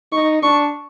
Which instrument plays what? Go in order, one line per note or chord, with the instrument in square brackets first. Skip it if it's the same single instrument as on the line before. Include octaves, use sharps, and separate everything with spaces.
[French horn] D#4 [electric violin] C#6
[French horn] D4 [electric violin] C#6